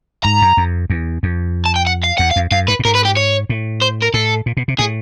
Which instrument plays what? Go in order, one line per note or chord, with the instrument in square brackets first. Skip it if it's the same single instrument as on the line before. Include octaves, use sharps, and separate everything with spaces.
[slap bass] G#2 [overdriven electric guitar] A#5
[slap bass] F#2
F2
E2
F2
[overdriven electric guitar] A5
G5
F#5
F5
[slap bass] E2 [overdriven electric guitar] F#5
[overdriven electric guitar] F5
[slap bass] F2
[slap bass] F#2 [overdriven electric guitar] F5
[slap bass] G2 [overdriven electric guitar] B4
[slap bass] A2
[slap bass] G#2 [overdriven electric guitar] A#4
[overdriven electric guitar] B4
G4
C#5
[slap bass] A2
[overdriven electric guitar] C5
A#4
[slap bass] A2 [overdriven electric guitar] A4
[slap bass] A#2
B2
C3
[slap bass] A2 [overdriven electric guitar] G#4